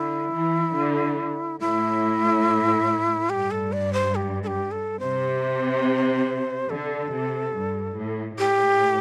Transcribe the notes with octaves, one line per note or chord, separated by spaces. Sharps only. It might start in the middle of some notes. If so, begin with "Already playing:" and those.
Already playing: D3 E4
E3
D3
A2 E4
G2 G4
A4
D5
C5
G4
A4
G4
A4
C3 C5
D3 A4
C3
G2
A2
A2 G4